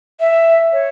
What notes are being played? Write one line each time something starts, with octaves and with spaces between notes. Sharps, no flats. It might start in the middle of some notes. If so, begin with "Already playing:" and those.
E5
C#5